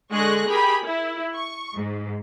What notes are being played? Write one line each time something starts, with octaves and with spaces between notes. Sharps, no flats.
D3 G#3 G#4 C#6 F#6 A#6
G4 G#4 A#4 B5
E4
C#6
G#2